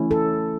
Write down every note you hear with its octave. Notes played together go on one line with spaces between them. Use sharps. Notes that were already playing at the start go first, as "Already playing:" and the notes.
Already playing: E3 A3 C#4 E4
A4